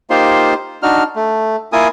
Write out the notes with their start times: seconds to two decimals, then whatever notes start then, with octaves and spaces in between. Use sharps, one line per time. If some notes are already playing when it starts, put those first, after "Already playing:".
0.10 A#3 D#4 F4 G4 C5 C6
0.83 D4 D#4 F#4 F6
1.16 A3
1.73 A#3 E4 F4 A#4 G#5 D#6